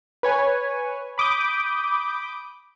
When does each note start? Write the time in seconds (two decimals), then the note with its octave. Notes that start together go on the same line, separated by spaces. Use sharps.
0.23 B4 C#5 G#5
1.18 B5 D6 D#6 G6